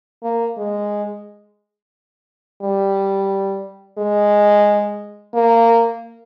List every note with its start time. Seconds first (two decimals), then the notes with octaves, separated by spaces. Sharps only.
0.23 A#3
0.57 G#3
2.62 G3
3.98 G#3
5.34 A#3